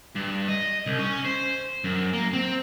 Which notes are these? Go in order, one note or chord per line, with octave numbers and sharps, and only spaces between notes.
G2
D#5
C2
C#4
C5
F#2
A#3
C4